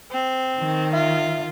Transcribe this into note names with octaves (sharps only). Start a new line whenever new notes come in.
C4
D#3
F4 E5